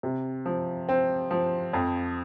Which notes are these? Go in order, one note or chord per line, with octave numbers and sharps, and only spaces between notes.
C3
F3
C4
F3
F2